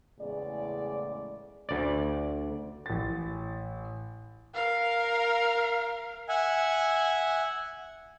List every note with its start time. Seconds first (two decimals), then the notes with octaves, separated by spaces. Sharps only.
0.19 E2 A2 C#3 G#3 D5
1.69 D2 D5
2.86 A1 A6
4.54 A#4 F5
6.28 E5 F#5 G#5